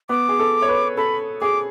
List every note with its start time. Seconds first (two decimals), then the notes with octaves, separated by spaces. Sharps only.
0.09 B3 D6
0.29 G#4
0.39 A4
0.62 C#5
0.68 B4
0.97 A4 B5
1.41 G#4 D6